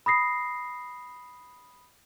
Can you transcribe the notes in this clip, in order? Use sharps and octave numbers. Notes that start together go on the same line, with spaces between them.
B5 D#6 A#6 C7